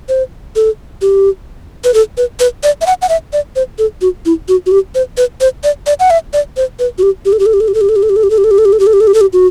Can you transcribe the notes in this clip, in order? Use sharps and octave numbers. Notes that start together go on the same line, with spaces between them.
C5
A4
G4
B4
A4
B4
B4
D5
E5
F#5
F#5
E5
D5
C5
A4
F#4
E4
F#4
F#4
G4
C5
B4
C5
D5
D5
F#5
E5
D5
C5
B4
F#4
G4
G4
A4
G4
A4
G4
A4
G4
A4
G4
A4
G4
A4
G4
A4
G4
A4
G4
A4
G4
A4
G4
A4
G4
A4
G4
A4
G4
A4
G4
F#4